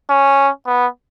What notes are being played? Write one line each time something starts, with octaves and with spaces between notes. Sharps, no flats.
C#4
B3